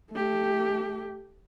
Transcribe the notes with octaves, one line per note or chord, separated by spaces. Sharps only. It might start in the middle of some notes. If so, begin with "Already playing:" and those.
A3 G4